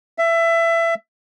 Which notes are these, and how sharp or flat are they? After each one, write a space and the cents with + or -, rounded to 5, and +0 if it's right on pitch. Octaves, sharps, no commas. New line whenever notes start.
E5 +20